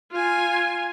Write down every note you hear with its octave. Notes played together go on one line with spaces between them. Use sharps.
F4 G#5